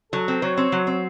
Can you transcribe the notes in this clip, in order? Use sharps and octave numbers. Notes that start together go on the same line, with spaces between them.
F#3 A4
C4 A4
F#3 C#5
C4
F#3
C4 C#5